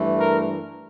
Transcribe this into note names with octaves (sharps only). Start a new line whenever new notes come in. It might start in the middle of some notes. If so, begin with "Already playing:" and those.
Already playing: G2 E3 A3
A#4